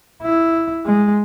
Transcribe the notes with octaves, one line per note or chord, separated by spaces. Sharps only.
E4
G#3